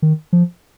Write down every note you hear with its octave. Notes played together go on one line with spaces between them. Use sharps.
D#3
F3